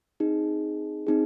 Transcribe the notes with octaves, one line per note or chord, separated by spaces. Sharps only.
C4 D#4 G#4
C4 D#4 G#4